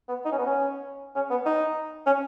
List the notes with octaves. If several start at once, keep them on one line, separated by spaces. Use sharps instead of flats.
B3
D#4
C#4
B3
C#4
C#4
B3
D#4
C#4